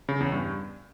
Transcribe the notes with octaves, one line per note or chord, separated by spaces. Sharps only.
C#3
E2
G2